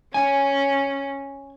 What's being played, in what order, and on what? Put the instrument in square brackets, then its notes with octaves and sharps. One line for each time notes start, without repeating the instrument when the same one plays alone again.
[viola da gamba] C#4 [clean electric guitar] G#5